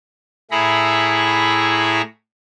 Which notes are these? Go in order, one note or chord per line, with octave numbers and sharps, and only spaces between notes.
A2 E4 G#4 A#5 B5 C#6